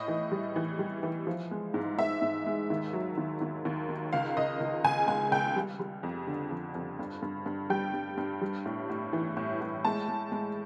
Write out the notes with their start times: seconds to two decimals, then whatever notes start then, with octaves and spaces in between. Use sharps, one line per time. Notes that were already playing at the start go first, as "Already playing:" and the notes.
Already playing: A2 D#5
0.08 E3
0.31 G3
0.56 E3
0.79 G3
1.03 E3
1.27 F3
1.51 G#3
1.74 G#2
1.98 G#2 E5
2.22 G#2
2.46 G#3
2.70 D#2
2.93 F#3
3.18 D#2
3.42 D#2
3.65 D#2
3.89 D#3
4.13 C#2 F5
4.37 C#2 D#5
4.60 C#2
4.84 C#2 G#5
5.08 G#3 G#5
5.32 C#2 G5
5.56 G3
5.80 G3
6.03 F2
6.27 D3
6.51 F2
6.75 F2
6.99 G2
7.22 G2
7.46 G2
7.70 G3 G5
7.94 G2
8.17 G2
8.41 G3
8.66 A2
8.90 A2
9.13 E3
9.37 A2
9.61 A2
9.85 G#3 A5
10.08 G#3
10.32 G#3